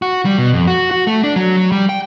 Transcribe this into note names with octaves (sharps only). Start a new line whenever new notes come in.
F#4
G3
B2
F2
F#4
F#4
A3
D4
F#3
F#3
G3
G5